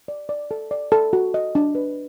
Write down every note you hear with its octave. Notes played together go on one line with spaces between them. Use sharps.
D5
D5
A4
D5
A4
F#4
D#5
D4
B4